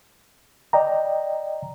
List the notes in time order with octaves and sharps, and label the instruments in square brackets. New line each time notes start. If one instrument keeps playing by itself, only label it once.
[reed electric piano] D5 D#5 G5 A#5